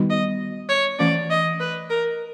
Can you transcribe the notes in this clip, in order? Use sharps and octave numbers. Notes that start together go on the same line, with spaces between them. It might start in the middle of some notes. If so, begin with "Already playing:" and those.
Already playing: D#3 G3 B3 D#4 F#4
D#5
C#5
E3 A3 C#4 D5
D#5
B4
A#4